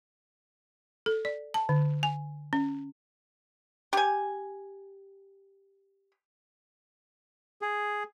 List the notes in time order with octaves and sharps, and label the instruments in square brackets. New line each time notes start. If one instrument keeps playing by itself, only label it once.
[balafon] A4
D5
A5
D3
G#5
C#4
[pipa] G4 G#5
[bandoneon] G#4